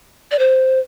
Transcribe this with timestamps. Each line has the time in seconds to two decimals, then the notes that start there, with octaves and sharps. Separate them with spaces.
0.31 D5
0.39 C5